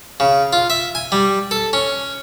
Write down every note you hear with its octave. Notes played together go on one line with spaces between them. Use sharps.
C#3
F4
E5
G#5
G3
A4
C#4